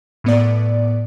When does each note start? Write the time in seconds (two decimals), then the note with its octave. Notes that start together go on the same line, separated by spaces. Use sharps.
0.24 A2 B3 D5